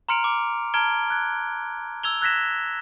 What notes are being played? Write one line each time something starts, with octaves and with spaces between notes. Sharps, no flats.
A#5 C6 F6 C#7 D7 F7
D6 D7
A5 A#5 F6 G#6 D7 G7
F#6 G#6
E6 G#6 F7 G7
E6 F#6 G#6 A#6 B6 E7